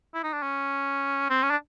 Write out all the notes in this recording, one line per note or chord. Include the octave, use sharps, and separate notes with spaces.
E4
D#4
D4
C#4
C4
C#4
D4